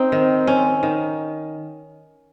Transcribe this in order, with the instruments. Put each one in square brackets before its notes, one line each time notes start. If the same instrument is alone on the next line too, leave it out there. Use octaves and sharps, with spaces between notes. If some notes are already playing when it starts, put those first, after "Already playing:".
Already playing: [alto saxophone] C4 [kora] D#4
[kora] D#3
C#4
D#3